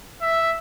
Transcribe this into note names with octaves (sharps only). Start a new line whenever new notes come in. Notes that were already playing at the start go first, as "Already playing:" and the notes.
E5